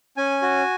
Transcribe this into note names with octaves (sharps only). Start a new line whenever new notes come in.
C#4 G#5
F#4